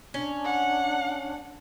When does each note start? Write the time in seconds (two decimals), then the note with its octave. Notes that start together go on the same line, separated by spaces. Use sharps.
0.14 C#4 D4
0.45 F#5